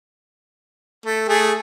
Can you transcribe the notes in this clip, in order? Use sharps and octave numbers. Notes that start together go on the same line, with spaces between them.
A3
A3 G#4